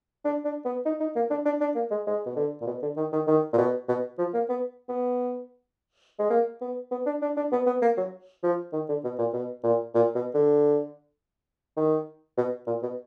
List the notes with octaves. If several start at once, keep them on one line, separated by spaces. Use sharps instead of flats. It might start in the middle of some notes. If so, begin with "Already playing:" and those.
D4
D4
B3
D#4
D#4
A#3
D4
D4
D4
A#3
G#3
G#3
B2
D3
A#2
B2
D3
D#3
D#3
D#3
A#2
B2
B2
F3
A#3
B3
B3
G#3
A#3
B3
B3
D4
D4
D4
B3
B3
A#3
F#3
F3
D#3
D3
B2
A#2
B2
A#2
A#2
B2
D3
D#3
B2
A#2
B2